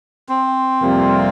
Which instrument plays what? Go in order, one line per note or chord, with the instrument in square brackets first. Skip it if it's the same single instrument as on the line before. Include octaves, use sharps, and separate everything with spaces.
[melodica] C4
[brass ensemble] F2 C3 G3 A#3 F4